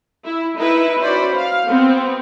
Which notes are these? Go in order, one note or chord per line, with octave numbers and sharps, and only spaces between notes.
E4
D#4 E4 B4
C#4 F#4 C5 D5 B5
F5
B3 C4